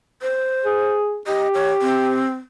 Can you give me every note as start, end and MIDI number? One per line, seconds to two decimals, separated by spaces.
0.22 0.92 72
0.65 1.21 68
1.27 2.26 67
1.27 1.48 75
1.54 1.71 73
1.81 2.31 60